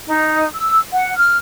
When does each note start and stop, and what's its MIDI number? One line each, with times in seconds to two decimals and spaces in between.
0.07 0.44 63
0.54 0.79 88
0.92 1.13 78
1.16 1.37 89